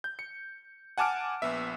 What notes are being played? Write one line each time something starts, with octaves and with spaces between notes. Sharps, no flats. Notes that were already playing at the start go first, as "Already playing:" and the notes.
G6
C#7
F#5 G#5 A5 D6 F6 D7
A#1 B3 E5